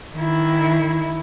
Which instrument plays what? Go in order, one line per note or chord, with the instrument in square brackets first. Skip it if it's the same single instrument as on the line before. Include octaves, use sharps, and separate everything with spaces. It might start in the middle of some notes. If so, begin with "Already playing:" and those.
[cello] D#3 E4